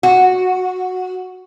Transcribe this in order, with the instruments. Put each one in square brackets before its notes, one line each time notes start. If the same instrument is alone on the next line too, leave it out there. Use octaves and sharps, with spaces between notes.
[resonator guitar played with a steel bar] F#4